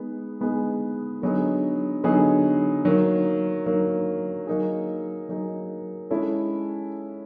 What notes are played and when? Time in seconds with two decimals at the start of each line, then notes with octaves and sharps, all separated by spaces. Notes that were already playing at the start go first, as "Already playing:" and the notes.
Already playing: G#3 B3 D#4 G#4
0.41 G#3 B3 D#4 G#4
1.22 D3 F#3 B3 D#4 G#4
2.04 D3 F#3 B3 D#4 G#4
2.85 D#3 F#3 A#3
3.66 D#3 F#3 A#3
4.47 F#3 A#3 D#4 G#4
5.29 F#3 A#3 D#4 G#4
6.10 G#3 C#4 E4 A4